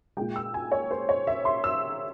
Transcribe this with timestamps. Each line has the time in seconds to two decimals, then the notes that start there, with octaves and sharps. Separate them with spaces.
0.17 A#2 G#3 G5
0.36 E6
0.54 G#5
0.72 C#5
0.91 C5
1.09 C#5
1.27 E5
1.45 C6
1.64 E6